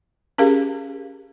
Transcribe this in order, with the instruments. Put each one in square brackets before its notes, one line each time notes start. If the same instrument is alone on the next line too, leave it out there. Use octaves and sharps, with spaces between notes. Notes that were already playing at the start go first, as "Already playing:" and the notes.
[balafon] C#4 G4 G#4 A#4 F5